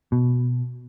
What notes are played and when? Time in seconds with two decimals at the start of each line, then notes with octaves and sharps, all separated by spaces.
0.12 B2